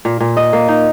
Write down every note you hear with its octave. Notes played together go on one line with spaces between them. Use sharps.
A#2
A#2
D#5
A#3
D#4